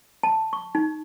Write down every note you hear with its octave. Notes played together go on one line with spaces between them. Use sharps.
A5
C#6
D#4